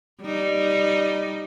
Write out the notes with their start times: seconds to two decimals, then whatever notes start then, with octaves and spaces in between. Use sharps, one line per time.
0.22 G3 D#4